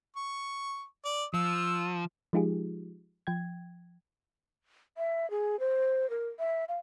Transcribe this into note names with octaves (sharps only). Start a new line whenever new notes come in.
C#6
D5
F3 E6
F3 G#3 D#4 F4 G4 G#4
F3 G5 G#6
E5
G#4
C5
A#4
E5
F5